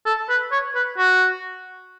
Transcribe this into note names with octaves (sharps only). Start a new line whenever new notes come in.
A4
B4
C#5
B4
F#4